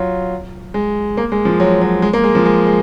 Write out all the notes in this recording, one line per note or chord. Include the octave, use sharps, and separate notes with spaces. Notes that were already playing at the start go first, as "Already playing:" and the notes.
Already playing: F#3 F4
G#3
A#3
G#3
F3
F#3
F#3
G#3
A#3
G#3
F3
G#3
G#3